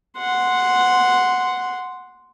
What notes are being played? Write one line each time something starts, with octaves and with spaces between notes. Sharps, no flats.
F#5 C6